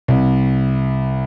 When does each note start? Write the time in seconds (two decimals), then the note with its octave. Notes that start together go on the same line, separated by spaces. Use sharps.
0.08 C2